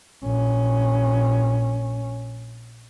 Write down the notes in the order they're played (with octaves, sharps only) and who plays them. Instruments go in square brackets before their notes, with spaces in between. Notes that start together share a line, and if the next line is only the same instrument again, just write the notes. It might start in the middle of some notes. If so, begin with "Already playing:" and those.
[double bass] A#1 C#4